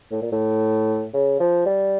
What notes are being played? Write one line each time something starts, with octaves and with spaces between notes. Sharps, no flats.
A2
A#2
A2
C#3
F3
G3